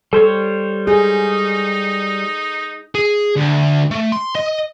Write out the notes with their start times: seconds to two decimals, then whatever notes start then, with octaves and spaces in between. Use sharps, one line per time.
0.13 G3 A4 C5 C#5
0.87 D#4 G#4
2.95 G#4
3.37 D2
3.91 A3
4.12 C6
4.35 D#5